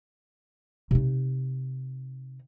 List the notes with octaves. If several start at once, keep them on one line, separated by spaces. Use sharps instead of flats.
C3 D#4